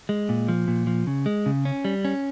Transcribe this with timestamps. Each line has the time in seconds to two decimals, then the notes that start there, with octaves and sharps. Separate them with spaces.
0.09 G#3
0.29 A#2
0.48 F3
0.68 A#2
0.87 F3
1.07 C#3
1.26 G#3
1.46 C#3
1.65 C#4
1.85 G3
2.05 C#4